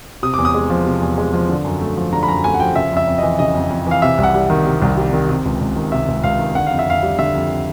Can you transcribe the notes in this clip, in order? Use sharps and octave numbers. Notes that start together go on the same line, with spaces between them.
C3 D#6
E2 D6
D#6
G#3
F3
C3
E2
G#3
F3
D3
F#2
A3
F3
D3 A#5
B5
F#2 A#5
A3 G#5
F#5
F3 G5
C#3 E5
F2 E5
F2
E3 D#5
C#3 D#5
F2
F2
E3 F5
C3 E5
C2
F#5
G3
D#3
C3
C2
G3
D#3
C3
C#2
C#2
D#3
C3 E5
C#2
C#2 F5
D#3
D3 F#5
F2 F5
E5
F2 F5
G3
D3 E5
F2